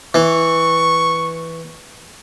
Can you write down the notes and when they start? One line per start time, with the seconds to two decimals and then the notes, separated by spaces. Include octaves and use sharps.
0.14 E3 C#6